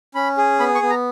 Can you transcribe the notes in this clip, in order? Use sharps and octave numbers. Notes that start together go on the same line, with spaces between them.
C#4 B5
G#4
B3 B5
C#6
B3
A#5